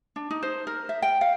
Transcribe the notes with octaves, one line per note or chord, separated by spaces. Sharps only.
D4
D#4
C5
A#4
E5
G5
F5